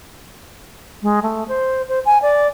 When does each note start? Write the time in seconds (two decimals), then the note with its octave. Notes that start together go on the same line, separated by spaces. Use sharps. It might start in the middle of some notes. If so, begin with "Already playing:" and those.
1.02 G#3
1.23 A3
1.48 C5
1.89 C5
2.06 G#5
2.22 D5